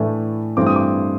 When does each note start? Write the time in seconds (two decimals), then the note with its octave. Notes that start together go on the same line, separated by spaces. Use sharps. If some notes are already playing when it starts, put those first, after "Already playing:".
Already playing: A2 E3 A3 D4
0.57 G2 E3 A3 C4 D6
0.67 D#6
0.76 D6